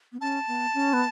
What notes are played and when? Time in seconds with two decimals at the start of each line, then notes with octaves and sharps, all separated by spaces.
0.12 B3
0.21 C#4 A5
0.48 B3
0.74 C#4
0.93 B3